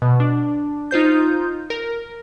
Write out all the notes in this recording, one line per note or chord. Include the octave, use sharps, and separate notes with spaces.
B2
D4
D#4 F4 C5 G6
A#4